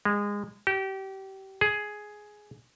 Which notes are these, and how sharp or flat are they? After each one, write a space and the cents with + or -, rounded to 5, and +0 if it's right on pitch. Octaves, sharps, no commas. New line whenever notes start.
G#3 -25
G4 -30
G#4 +5